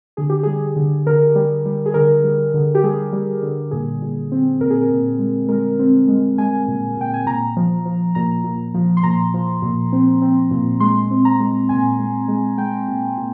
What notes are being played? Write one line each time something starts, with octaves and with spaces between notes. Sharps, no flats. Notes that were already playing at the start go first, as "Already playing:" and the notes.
D3 G#4
G4
G3 G#4
D3
D3 A#4
G3
G3
G#4
D3 A#4
G3
D3
G4
G3 G#4
G3
D3
A#2 G#4
A#2
C4
A#2 A#4
G#4
A#4
A#2
G#3
G#3 A#4
C4
G#3
G#3 G#5
A#2
A#2 G5
G#5
A#2 A#5
F3
F3
A#2 A#5
A#2
F3
C6
A#2 A#5
F3
A#2
C4
C4
A#2
G#3 C6
C4
A#5
G#3
A#2 G#5
G#3
G#3
G#3 G5
A#2
A#2